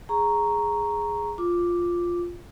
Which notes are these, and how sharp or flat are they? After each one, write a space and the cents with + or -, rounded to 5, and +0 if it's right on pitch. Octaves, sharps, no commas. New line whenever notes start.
G#4 +0 A#5 +0 C#6 +0
F4 +0 D6 +0